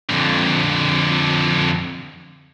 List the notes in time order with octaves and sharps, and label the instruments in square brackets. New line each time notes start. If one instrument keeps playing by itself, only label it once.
[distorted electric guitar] F2 D3